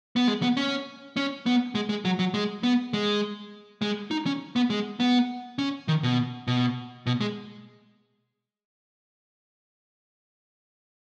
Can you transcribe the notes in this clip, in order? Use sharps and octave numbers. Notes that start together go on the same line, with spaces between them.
B3
G#3
B3
C#4
C#4
B3
G#3
G#3
F#3
F#3
G#3
B3
G#3
G#3
D#4
C#4
B3
G#3
B3
C#4
D#3
B2
B2
B2
G#3